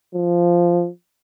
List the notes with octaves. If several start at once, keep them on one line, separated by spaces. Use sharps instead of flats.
F3